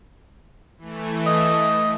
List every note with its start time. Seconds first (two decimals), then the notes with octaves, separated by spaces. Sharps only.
0.78 E3 A3
1.27 D#5